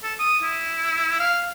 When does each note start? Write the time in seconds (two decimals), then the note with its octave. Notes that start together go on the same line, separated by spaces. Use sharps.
0.03 A4
0.19 D#6
0.43 E4
1.19 F5